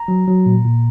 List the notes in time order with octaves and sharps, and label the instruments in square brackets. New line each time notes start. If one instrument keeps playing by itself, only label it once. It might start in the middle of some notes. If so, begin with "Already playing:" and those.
Already playing: [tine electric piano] A#5
F#3
F#3
A#2
A#2